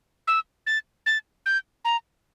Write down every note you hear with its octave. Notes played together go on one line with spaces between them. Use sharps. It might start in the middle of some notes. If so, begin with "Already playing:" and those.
E6
A6
A6
G6
A#5